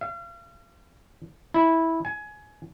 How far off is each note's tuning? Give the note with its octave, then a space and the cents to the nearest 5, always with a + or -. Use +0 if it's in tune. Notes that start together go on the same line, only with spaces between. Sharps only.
F5 -40
E4 -10
G#5 +20